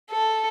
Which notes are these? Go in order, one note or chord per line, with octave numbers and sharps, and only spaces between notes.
A4